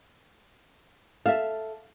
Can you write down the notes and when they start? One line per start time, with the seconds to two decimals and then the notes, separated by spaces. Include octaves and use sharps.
1.26 A4 E5 F5